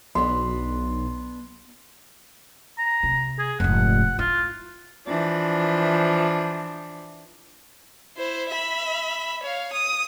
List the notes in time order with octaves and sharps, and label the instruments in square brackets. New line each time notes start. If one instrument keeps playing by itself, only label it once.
[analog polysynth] B1 [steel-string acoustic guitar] B3 D4 [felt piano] C6
[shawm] A#5
[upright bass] C3
[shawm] G#4
[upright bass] F1 G#2 [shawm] F#5
[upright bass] E4 [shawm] F4
[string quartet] E3 F3 D4
[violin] E4 C5
E5 B5
C#5 F5
D#6